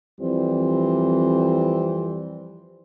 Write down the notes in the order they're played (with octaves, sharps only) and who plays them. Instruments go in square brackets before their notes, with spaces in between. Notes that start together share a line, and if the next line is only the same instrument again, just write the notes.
[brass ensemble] F2 E3 G3 C4